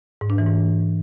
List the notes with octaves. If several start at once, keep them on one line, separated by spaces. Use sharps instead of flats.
G#2
D4
E3
G#2